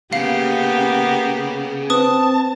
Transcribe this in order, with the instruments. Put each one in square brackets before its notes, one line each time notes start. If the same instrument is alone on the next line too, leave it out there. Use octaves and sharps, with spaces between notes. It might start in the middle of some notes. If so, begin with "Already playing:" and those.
[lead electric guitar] C#3 [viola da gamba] A#3 B3 G4 [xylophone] F5
[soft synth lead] C4 [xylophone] B4 D#6 [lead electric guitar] A5